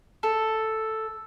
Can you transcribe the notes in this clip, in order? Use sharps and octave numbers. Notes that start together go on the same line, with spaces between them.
A4